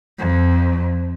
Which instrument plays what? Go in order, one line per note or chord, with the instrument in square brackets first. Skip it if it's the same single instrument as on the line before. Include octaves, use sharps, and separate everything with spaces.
[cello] F2